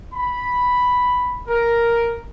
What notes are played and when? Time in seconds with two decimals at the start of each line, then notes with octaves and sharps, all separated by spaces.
0.13 B5
1.48 A#4